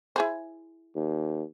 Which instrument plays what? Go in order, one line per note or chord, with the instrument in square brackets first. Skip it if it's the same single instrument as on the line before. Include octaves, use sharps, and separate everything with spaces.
[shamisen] E4 G#4 C5
[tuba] D#2